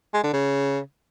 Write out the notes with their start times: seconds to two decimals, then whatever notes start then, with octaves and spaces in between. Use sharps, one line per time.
0.14 G#3
0.23 D3
0.33 C#3